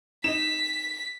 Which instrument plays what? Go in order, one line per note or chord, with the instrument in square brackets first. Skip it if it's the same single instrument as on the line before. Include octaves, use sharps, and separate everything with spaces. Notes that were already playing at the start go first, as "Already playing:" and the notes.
[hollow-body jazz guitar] D#4 D#5 [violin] B6 [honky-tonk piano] E7